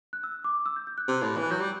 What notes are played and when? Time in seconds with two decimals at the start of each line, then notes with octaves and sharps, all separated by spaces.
0.13 F#6
0.24 E6
0.44 D6
0.66 E6
0.76 G6
0.87 G6
0.98 F#6
1.08 C3
1.22 A2
1.37 E3
1.43 F#6
1.51 F#3 G6
1.60 G3